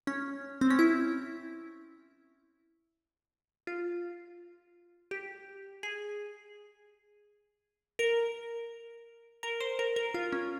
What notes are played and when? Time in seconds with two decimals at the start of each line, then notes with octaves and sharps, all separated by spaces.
0.07 C#4
0.61 C4
0.70 C#4
0.79 E4
3.67 F4
5.11 G4
5.83 G#4
7.99 A#4
9.43 A#4
9.61 C5
9.79 A#4
9.96 A#4
10.14 F4
10.32 C#4